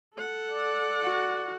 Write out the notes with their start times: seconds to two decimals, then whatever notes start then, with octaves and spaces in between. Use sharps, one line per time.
0.14 A4 F#5
0.50 D5
1.01 F#4